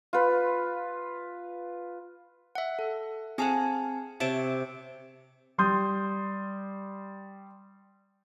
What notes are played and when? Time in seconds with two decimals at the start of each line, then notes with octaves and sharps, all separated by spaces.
0.13 F4 B4
2.55 E5 F#5
2.79 A4
3.38 C4 G#4 F5 F#5 G#5 A5
4.20 C3 C#5 E5 A5 D7
5.58 G3 C6 D#6 G6